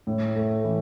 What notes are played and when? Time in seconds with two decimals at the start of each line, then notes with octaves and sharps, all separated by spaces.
0.07 A2
0.36 A3
0.64 E3